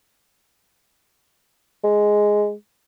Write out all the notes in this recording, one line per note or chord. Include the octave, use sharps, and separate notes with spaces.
G#3